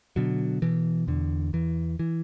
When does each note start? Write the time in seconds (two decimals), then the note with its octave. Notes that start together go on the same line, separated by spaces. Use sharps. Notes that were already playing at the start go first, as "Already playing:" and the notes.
0.16 B2 D3 F#3
0.62 B2 E3
1.08 E2 D3
1.53 E2 E3
1.99 E3